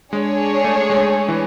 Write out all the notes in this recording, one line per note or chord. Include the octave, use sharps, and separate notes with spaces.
G#3 D4 G#4 C#5
A3
G#3
E3